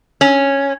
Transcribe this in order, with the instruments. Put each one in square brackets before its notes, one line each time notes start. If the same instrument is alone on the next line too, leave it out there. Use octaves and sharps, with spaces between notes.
[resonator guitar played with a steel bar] C#4